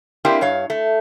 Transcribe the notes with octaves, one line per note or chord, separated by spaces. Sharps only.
A#3 C4 D4 E4 G4
G2 C#5 F5
A3